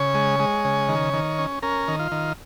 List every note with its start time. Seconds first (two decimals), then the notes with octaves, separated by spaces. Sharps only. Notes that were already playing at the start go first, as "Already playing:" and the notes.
Already playing: C#3 C#5
0.14 G#3
0.40 G#3
0.65 C#3
0.88 D#3
1.14 D#3
1.39 C#4
1.62 C#4 A#4
1.88 D#3
1.99 F4
2.12 D#3